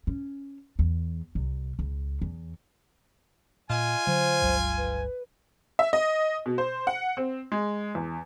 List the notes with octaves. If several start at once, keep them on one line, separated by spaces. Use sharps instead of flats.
C#4
E2
C2
C#2
E2
A#2 F4 D#5 G#5
D3 F#3 C5
G1 C#2 F#3
B4
E5
D#5
B2
C5
F#5
C4
G#3
E2